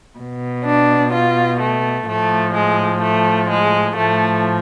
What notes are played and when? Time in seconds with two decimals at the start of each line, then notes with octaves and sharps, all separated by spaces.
0.18 B2
0.66 D4
1.13 F4
1.60 A3
2.07 A2 F3 A3
2.55 G#3
3.02 A3
3.50 G#3
3.97 A2 F3 A3